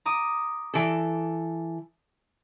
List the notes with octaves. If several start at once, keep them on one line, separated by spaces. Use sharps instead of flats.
A#5 D6 D#6
E3 A4